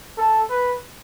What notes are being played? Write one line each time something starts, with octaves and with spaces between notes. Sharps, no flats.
A4
B4